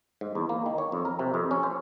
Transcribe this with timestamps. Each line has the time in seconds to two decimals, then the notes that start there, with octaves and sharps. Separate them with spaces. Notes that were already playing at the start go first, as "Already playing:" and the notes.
0.21 G#2
0.35 E2
0.49 A#3
0.66 D#3
0.78 C#5
0.92 F2
1.05 A#4
1.19 C3
1.34 F2
1.51 C#4
1.63 C5